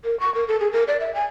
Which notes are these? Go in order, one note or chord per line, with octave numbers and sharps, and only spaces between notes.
A#4
C#6
A#4
A4
G#4
A#4
D5
E5
G#5